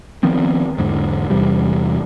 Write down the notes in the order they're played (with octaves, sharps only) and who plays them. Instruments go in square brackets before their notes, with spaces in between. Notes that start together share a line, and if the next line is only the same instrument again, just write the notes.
[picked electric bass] D#3 F3 B3 C4
E2 G#2 D3
E2 C3 E3 G3